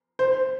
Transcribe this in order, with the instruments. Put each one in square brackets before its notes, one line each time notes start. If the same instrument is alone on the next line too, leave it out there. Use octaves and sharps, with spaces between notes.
[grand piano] C5